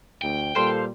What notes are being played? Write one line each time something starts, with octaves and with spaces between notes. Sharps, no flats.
D2 G5
A#2 G3 A4 C5 F5 C6